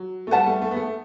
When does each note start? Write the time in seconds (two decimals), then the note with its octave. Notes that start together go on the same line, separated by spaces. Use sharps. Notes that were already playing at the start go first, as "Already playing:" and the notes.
Already playing: F#3
0.27 A3
0.31 G3 B4 F#5 A5
0.47 A3
0.62 A3
0.71 B3
0.76 A3